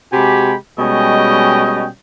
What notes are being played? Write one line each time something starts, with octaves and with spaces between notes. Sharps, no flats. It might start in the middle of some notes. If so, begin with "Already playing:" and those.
C3 G#3 F#4 G4 G#5 B5
B2 G3 G#3 C#4 D#5 G5